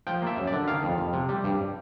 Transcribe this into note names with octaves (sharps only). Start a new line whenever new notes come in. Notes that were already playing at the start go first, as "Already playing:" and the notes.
F3 G5
A#3
E5
F#2
D3 D5
D#3 F5
F2
F2
C3
G3
G2